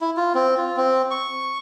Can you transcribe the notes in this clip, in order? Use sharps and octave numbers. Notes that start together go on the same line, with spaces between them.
E4
F4
C4
F4
C4
C#6